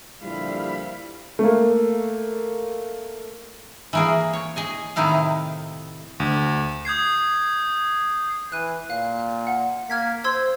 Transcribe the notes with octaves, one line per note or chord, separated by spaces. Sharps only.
A#2 D3 F3 G3 E4 F5 B5
A3 A#3
E3 A#3 G#4
C#5
G#4 D#5 G#5
A2 C3 D#3 D#4 E4 F5
D2
D#6 G6 G#6 C7
E3 F#6 D#7
A#2 F5
F#5
A#3 F6 G#6 B6
C5 C6 E6 G#6